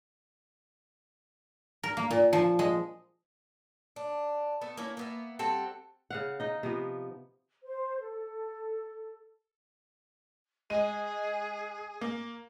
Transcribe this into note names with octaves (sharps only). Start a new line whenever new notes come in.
A#4
A#3
A#2
F3
G#3
D4
A3 B3 A4
A#3 C#4 E4
A#3 B3 E5
G3 C4 A4 F#5
C#3 F5 F#5
D#4 D#5
C3 F3 B3
C5
A4
G#3 G#4 D#7
A#3